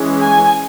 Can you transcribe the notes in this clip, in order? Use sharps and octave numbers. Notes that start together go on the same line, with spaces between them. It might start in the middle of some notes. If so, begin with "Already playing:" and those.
Already playing: E3 G#3 C#4
G#5